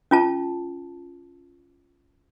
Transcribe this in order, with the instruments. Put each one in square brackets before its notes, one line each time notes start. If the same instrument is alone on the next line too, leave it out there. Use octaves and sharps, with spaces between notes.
[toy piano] C#4 F4 A5